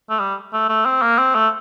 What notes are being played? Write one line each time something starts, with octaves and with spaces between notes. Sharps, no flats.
A3
G3
A3
A3
C4
A#3
C4
A3